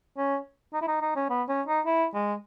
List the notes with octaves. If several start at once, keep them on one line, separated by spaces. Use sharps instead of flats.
C#4
D#4
E4
D#4
D#4
C#4
B3
C#4
D#4
E4
G#3